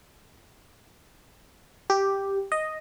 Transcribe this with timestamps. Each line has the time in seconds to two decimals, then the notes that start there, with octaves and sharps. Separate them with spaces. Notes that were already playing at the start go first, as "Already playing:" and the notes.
1.90 G4
2.52 D#5